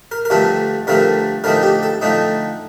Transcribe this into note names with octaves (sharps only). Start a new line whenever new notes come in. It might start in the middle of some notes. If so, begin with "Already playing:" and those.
A#4
A#4
G2 D3 F3 A3 C4 A4
G2 D3 F3 A3 C4 A#4
D3 F3 A3 C4 D#4 A#4
G4
A4
D3 F3 A3 C4 D#4